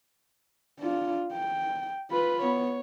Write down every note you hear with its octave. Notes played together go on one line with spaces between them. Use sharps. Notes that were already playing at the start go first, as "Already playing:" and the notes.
D4 F4
G5
F4 B4 B5
B3 C#5